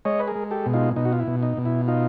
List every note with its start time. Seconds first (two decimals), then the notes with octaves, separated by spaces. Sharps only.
0.05 G#3 C#5 D#5
0.19 B4
0.28 G#4 A#4
0.36 G#3
0.51 G4 A4
0.66 B2
0.74 D#4 F4
0.96 B2 D#4
1.05 F#4
1.13 F4
1.20 E4
1.27 B2
1.43 D#4
1.57 B2
1.65 E4
1.88 D#4 F4